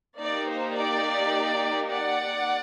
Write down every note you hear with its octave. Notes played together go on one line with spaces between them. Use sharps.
A#3 D#4 G4 D5
C5
D5
D5 F#5